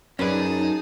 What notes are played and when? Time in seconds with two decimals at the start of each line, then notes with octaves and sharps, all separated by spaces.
0.19 F#2 C#4 D#4 G#4 B4 D5 A5